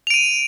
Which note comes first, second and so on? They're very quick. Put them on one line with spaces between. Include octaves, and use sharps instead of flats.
F7 D7 D#7